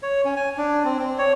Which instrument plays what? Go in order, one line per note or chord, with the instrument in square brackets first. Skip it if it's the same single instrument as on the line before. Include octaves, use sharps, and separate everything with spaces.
[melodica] C#5
C#4
G#5
D4
C4
C4
C#5